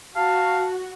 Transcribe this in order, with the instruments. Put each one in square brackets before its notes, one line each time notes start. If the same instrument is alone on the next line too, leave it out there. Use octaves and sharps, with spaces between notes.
[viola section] F#4 [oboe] F5 [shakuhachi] A5